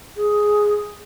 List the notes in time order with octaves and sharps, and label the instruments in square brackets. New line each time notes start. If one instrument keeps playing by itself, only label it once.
[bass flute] G#4